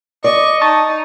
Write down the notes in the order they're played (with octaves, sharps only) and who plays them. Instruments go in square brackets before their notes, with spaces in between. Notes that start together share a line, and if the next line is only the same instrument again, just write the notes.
[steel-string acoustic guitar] D5 [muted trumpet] D#5 [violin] C#6
[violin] D#4 [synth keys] A5 C#6 A6